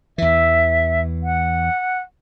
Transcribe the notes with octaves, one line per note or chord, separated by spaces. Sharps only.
E2 E3 E5
F#5